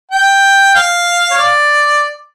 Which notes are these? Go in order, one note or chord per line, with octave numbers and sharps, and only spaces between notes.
G5
F5
C#5
D5